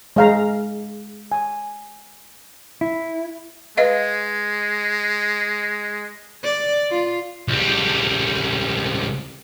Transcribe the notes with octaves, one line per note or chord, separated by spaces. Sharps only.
G#3 F5 A#5
G#5
E4
G#3 B4 D#5 F5
D5
F4
C#2 G3